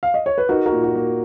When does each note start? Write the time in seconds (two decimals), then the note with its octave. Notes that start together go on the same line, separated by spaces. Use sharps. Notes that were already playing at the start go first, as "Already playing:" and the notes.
0.03 F5
0.14 D#5
0.26 C#5
0.38 B4
0.49 D#4 F#4 A#4
0.66 F#4 A#4
0.72 A#2
0.83 F#4
0.95 A#3